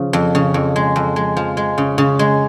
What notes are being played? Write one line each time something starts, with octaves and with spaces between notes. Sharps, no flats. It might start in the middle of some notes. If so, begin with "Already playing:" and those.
Already playing: C#3 F3
F2
C#3
F2
G#3
F2
G#3
F3
G#3
C#3
C#3
G#3